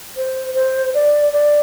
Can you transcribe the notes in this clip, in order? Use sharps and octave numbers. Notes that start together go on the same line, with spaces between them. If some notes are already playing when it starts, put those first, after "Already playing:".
C5
C5
D5
D5